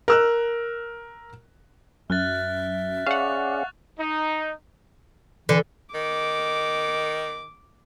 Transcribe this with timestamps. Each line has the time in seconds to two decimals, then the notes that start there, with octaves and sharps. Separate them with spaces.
0.08 A#4 E6 F#6
2.10 F#2 E5 F6 F#6 A6
3.06 C#4 G#4 D5 F5 F#5 C#6 F7
3.99 D#4
5.49 D3 E3
5.94 D#3 D6